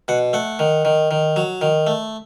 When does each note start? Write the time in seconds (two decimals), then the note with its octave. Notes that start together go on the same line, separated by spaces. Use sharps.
0.08 B2 F#5
0.33 A3 F#5
0.59 D#3
0.85 D#3
1.11 D#3
1.36 F#3
1.61 D#3
1.87 A3